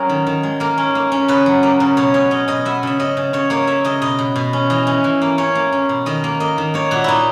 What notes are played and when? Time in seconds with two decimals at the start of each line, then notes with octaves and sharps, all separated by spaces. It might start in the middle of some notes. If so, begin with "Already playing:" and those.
Already playing: F#3 C#4 G#4 A#4 C#5
0.09 D#3
0.27 D#3
0.43 G#3
0.60 A#3 A#4
0.78 C#4
0.95 A#3
1.12 C#4
1.28 C#3 B4
1.46 F#3
1.63 A#3
1.80 C#3
1.97 B2 C#5
2.14 B2 C#5
2.31 C#4 D#5
2.48 B2 D#5
2.65 B3 E5
2.83 C#3 E5
2.99 C#3 D#5
3.17 C#3
3.33 C#3 C#5
3.50 A#3 C#5
3.67 A#3 E5
3.84 C#3 D#5
4.01 B2 D#5
4.19 B2
4.36 B2
4.53 C#4
4.70 E3 D#5
4.87 C#4
5.04 E3
5.22 A#3
5.38 C#4 C#5
5.55 A#3
5.72 C#4
5.89 B2
6.06 D#3 D#5
6.24 A#3
6.40 A#3 D#5
6.58 D#3
6.74 A#3 C#5
6.91 A#2 F#4
7.04 A#2 D#4 E4